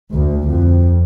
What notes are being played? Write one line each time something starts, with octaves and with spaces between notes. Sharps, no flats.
D2
F2